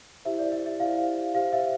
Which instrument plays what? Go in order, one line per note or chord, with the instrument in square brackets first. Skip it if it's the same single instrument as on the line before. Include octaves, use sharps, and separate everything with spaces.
[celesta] E4 G4 C5 E5
D5
E5
E5
E4 G4 C5 F5
G4 C5 F5
E5